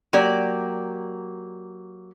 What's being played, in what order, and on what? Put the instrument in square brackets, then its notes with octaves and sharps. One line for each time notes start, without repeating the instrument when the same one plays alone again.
[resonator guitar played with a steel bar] F#3 A#3 G4 D5